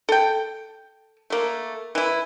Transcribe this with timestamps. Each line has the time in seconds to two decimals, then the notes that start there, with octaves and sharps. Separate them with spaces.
0.09 A4 G5
1.30 A3 A#3
1.95 E3 E4